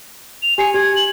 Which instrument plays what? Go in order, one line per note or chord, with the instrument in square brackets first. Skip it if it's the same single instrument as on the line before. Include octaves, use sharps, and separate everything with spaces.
[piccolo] F7
[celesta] G4 C7 C#7 [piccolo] G#5
[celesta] G4 [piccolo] G#6
[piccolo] F#7